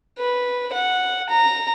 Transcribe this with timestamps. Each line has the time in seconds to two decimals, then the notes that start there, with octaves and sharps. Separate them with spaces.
0.18 B4
0.73 F#5
1.29 A#5